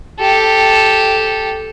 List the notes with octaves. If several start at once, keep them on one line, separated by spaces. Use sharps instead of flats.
G4 A4